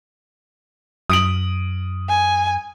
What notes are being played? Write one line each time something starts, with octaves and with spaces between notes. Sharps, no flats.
F#2 D#6 D7 F#7
G#5